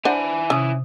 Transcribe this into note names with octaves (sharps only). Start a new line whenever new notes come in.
D4 E4 C5 F#5 G#5
C3 C#4 D#6